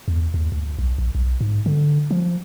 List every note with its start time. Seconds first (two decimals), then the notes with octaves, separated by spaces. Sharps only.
0.08 E2
0.34 D#2
0.52 D2
0.79 B1
0.98 A#1
1.15 B1
1.41 G#2
1.66 D3
2.11 F3